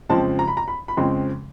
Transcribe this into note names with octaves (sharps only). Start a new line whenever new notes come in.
F2 C#3 F3 G#3 C4 A5
A#5
B5
A#5
B5
B5
F2 C#3 F3 G#3 C4 C6